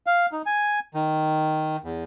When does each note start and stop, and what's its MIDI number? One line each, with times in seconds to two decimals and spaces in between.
0.07 0.26 77
0.32 0.42 63
0.46 0.80 80
0.94 1.77 51
1.84 2.04 40